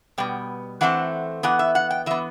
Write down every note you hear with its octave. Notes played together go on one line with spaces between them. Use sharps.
B2 G3 B3 G5
E3 A3 C4 F#5
E3 B3 F#5
E5
F#5
G5
E3 B3 E5